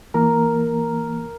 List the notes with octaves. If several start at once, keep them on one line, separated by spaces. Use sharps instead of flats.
E3 A#3 A#4